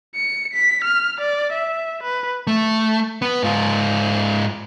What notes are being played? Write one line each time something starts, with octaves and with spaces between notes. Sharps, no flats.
C#7
B6
F6
D5
E5
B4
A3
B3
G#2 F4